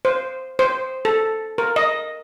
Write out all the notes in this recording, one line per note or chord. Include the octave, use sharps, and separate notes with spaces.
C5
C5
A4
A#4
D#5